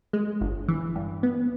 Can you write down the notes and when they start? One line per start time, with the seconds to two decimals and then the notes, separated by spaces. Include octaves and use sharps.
0.13 G#3
0.41 G1
0.68 E3
0.96 G2
1.23 B3